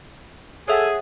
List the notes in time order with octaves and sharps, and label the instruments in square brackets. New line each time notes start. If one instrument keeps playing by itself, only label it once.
[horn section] G#4 [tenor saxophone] A4 [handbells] C#5 E5 F#5